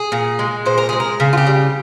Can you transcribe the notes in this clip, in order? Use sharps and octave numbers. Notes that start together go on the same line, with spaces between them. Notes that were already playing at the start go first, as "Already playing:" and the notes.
Already playing: G#4
A#2
G#3
A#2 C5
A#4
G#3 G#4
A#4
C#3
F4
G4
G3